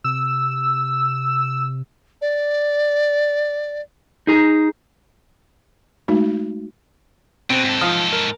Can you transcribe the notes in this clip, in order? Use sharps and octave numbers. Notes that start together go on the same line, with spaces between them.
C3 E6
D5
D#4 G#4 A#5
G#3 A3 D#4 F#4
B2 C4
G#2 A4
F3 F5 D#6
A#4